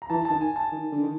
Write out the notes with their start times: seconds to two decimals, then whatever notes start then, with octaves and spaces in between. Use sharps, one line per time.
0.02 A#5
0.10 E3 A5
0.25 D#3 A5
0.41 G#5
0.56 A5
0.71 D#3
0.92 D3
1.03 D#3